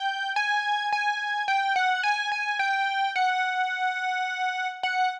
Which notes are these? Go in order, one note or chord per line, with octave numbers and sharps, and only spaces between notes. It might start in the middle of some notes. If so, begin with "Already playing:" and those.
Already playing: G5
G#5
G#5
G5
F#5
G#5
G#5
G5
F#5
F#5